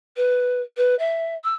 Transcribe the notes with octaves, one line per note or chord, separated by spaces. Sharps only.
B4
B4
E5
E6